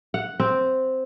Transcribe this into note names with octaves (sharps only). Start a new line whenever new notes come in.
F#5
C4